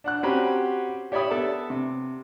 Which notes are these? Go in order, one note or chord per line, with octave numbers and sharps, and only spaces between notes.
D4 F#5 F#6
C4 C#4 F#4 G4 A#5 B5
G4 C#5 D5 E5 B5 D#6
B3 A4 E5 A5
C3